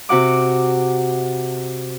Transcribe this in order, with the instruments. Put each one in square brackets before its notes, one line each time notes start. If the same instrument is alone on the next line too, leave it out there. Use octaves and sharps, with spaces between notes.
[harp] C3 F#4 F#5 D6